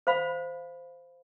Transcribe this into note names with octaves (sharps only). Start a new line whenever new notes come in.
C5 F5 B5